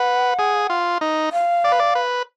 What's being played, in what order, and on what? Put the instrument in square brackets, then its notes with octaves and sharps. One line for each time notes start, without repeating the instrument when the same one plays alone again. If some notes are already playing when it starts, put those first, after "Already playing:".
Already playing: [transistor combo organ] B4 [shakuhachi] F#5
[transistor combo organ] G#4
F4
D#4
[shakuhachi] F5
[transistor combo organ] D5
B4
D5
B4